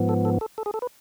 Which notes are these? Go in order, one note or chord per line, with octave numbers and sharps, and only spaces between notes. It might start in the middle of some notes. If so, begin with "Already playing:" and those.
Already playing: G#2 F3 B3
A4
A4
A4
A4
G#4
A4
B4